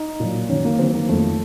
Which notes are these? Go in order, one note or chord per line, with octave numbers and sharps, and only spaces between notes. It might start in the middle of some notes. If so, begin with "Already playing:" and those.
Already playing: D#4
A#2 F#3
F#2 D#3 F#3 C#4
A#3
F#2 D#3 F#3 C4
A#3
F2 D#3 F#3 A3